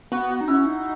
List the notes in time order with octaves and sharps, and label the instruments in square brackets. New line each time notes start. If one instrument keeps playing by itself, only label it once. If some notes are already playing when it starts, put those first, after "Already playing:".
[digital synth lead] B3 [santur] F#4
[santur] F#4
[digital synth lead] D#4
[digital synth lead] C#4 [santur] E4
[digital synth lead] D#4